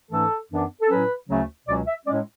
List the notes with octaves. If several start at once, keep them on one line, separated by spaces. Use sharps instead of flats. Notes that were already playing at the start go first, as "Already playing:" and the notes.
G#2 E3 A3 C#4 A4
F#2 E3 B3 D4
A4
A2 F#3 C#4 B4
D2 C#3 F#3 A3 C#4
C#2 B2 F#3 C#4 D5
E5
A2 G#3 C#4 D5